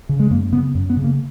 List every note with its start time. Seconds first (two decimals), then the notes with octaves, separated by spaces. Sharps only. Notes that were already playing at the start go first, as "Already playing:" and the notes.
0.09 C#3
0.20 G#3
0.31 F#2 A#3
0.52 C#3 B3
0.75 F#2
0.90 B3
0.97 C#3
1.04 A#3